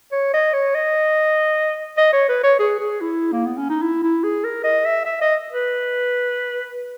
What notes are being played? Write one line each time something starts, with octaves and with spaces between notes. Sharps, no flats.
C#5
D#5
C#5
D#5
D#5
C#5
B4
C#5
G#4
G#4
E4
A#3
B3
C#4
D#4
E4
E4
G#4
A#4
D#5
E5
E5
D#5
B4